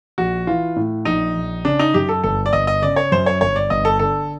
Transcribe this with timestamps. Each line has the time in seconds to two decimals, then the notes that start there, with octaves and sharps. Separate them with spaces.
0.18 A#1 F#4
0.47 E3 F4
0.76 A2
1.05 A#1 D#4
1.35 A#1
1.65 C#3 D4
1.79 D#4
1.94 F#2 G4
2.09 A4
2.24 G1 A4
2.46 D5
2.53 G1 D#5
2.67 D#5
2.82 C#3 D5
2.96 C#5
3.12 F#2 C5
3.26 C#5
3.41 G1 C#5
3.56 D5
3.70 G1 D#5
3.85 A4
3.99 D3 A4